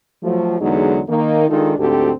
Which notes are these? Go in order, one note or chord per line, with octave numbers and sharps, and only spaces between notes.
F3 F#3 A3
E2 D3 F#3 G#3 D#4
D#3 A#3 D#4
D#3 G#3 D4 D#4 F4 A4
D2 G#2 C4 F#4 G4 A4